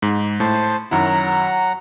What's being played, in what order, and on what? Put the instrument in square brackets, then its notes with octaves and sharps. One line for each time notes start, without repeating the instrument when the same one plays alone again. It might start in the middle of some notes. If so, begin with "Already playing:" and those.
[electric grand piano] G#2
[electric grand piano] A2 [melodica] C5 A5
[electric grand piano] F#2 D#3 E4 [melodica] F#3 F#5 A#5